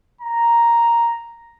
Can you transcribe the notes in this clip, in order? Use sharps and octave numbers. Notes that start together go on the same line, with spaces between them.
A#5